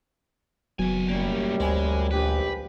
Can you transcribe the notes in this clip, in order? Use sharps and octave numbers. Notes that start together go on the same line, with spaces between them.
F#1 D#2 F#3 B3 G#5
F#2 A2 G3 A#3
D2 G#3 C5 G#5 B5
A#1 G4 B4